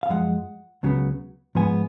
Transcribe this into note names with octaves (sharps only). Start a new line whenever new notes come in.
F5
F#2 F3 G#3 F#5
C#2 C#3 F#3 B3
G#2 F3 G#3 B3 G#5